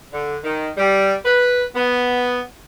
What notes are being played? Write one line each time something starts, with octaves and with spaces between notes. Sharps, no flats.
D3
D#3
G3
B4
B3